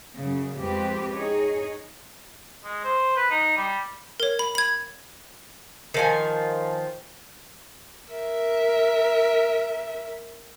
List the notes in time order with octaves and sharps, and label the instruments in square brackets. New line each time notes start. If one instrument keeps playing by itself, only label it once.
[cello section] F#2 C#3
F2 G#3 C4 G4 B4
D#4 G#4 C#5
[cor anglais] G#3
C5
B4
D#4
G3
[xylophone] A#4 C#5
B5
B5 G#6
[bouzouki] D#3 F3 G#5
[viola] A#4 E5